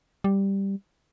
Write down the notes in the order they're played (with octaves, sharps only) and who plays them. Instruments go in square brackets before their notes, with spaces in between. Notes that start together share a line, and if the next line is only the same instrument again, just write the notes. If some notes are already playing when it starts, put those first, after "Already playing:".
[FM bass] G3